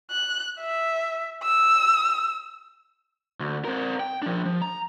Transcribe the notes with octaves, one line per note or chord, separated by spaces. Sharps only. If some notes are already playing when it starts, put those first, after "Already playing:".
F#6
E5
E6
D2
C4 A#4
G5
F3 D4
F3
A#5